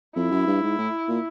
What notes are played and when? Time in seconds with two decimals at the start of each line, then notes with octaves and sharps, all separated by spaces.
0.16 F2 E4
0.31 F#2
0.47 G2
0.63 G#2
0.78 A2
1.08 A#2